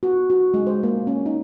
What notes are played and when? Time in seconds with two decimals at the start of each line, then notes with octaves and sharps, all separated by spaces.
0.03 F#4
0.30 F#4
0.54 G#3
0.67 C5
0.83 A#3
1.07 C#4
1.26 D#4